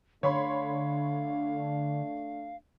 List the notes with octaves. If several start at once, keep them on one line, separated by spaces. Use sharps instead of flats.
D3 A3 D4 C#5 F5 B5 C6